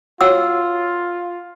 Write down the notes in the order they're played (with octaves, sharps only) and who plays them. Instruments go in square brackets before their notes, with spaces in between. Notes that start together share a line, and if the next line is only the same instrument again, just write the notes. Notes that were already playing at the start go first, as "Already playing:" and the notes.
[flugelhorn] F4 [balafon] F#4 C#5 [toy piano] F#5 E6